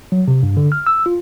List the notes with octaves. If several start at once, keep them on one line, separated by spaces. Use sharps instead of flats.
F#3
C3
G2
D3
F6
E6
F4